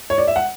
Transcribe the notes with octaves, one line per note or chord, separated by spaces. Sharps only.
C#5
D5
E5
F#5